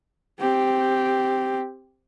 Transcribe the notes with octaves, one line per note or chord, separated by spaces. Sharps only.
C4 G4